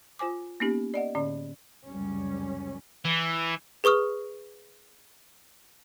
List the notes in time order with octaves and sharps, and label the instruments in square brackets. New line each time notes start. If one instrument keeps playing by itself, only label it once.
[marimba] F4 C5 G#5 D6
A#3 B3 C#4 D#4 G4
D5 D#5 F#5
A2 D3 C#4 D5
[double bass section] F1 C#2 F#2 G3 C#4
[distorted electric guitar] E3
[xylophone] G#4 B4 C#6 D#6 F6